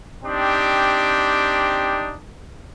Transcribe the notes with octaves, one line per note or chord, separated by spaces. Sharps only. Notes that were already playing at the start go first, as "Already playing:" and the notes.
C4 D4 D#4 G4